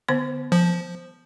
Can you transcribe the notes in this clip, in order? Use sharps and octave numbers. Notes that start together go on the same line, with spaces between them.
D3 B3 C5
F3